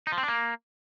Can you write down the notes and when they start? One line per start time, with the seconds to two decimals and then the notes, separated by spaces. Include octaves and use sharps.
0.07 D#4
0.12 F3
0.18 C4
0.23 D4
0.28 A#3